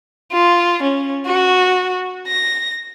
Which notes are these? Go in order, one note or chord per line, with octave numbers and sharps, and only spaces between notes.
F4
C#4
F#4
A#6